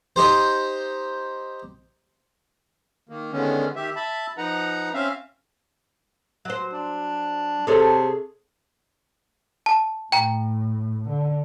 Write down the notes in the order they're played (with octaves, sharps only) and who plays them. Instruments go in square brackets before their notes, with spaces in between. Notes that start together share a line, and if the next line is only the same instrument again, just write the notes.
[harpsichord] D#4 G4 C5
[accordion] D#3 A#3
D3 D#3 G#3 B3 C#4
D#3 G4 E5
E5 A5 B5
F3 D#4 B4 F#5 A#5
C4 C#4 E5 F5
[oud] F#3 C5
[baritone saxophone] D4
[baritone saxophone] C3 [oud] G#4 A4 C#5
[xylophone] A5
[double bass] A2 [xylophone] G5 A#5
[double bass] D3